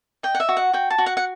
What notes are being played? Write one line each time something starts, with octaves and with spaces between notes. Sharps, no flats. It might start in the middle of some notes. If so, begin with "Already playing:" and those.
D#5 G5
F#5
E5
F#4
F#5
F#4 G5
A5
F#4
F#5
F#5